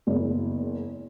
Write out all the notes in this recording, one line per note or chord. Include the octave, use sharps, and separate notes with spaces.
F#1 E2